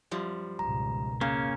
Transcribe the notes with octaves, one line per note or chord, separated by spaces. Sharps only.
F#2 F3 G3
G#1 C#2 B2 A#5
C#3 A#3 C#4 A#5